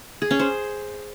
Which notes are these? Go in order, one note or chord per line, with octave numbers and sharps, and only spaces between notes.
G#4
C#4
C5